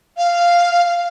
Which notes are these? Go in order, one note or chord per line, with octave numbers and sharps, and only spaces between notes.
F5